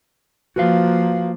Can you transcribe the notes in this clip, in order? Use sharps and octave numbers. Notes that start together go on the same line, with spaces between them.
F3 A#3 F#4 B4 F5